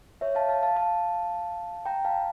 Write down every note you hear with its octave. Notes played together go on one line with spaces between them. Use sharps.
C#5 E5
F5 A5
F5 A5
F5 A5
F5 A5
G5 A#5
F5 A5